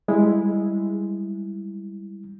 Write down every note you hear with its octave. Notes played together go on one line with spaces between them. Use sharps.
G3 G#3 E4